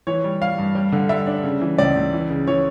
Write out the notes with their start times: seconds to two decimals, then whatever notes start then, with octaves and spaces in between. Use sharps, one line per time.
0.07 E3 C#5
0.24 G3
0.41 G3 F5
0.58 G2
0.75 G3
0.92 D3
1.09 G3 E5
1.27 D4
1.44 C#3
1.61 E3
1.78 C#2 D5
1.95 C#2
2.13 E3
2.30 C#3
2.47 E3 C#5